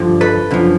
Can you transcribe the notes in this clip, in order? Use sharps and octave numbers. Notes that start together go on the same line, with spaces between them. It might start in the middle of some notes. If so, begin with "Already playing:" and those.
Already playing: G2 D3 F3
A4 B4
F#2 D3 F3